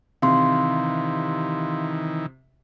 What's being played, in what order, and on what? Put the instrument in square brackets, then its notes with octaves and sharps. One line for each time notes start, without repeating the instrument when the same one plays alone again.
[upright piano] C3 [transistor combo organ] D#3 E3 [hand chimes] F5 C6